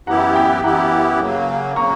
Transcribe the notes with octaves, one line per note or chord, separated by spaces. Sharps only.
F#2 E3 B3 E4 G4 F#5 A#5
G5 B5
F#2 E3 B3 E4 G4 F#5 A#5
C#3 F#3 A#3
C#3 F#3 A#3 A#5 C#6